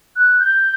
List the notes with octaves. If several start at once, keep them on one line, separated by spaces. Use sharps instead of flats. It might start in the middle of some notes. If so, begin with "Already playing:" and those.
F#6
G6